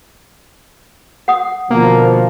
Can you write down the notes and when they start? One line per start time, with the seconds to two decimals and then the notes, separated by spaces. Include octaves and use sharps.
1.28 F#5 D#6
1.71 B2 D3 F3 A#3